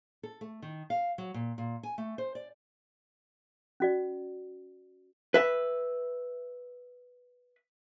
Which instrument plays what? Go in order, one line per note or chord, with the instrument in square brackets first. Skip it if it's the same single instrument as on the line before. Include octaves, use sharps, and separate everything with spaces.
[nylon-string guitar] A4
A3
D#3
F5
F#3
A#2
A#2
G#5
A3
C5
D5
[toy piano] C#4 F#4 D5
[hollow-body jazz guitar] B4 E5